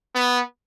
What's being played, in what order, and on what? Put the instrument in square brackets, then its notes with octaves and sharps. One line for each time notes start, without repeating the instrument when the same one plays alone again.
[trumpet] B3